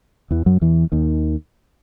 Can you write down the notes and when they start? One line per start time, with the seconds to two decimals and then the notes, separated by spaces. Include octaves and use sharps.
0.31 E2 E3
0.46 F#2 F#3
0.61 E2 E3
0.92 D#2 D#3